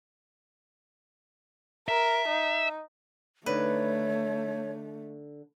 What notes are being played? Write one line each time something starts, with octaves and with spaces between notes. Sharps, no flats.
A#4 E5
D#4
D3 A3 D#4 B4 C#5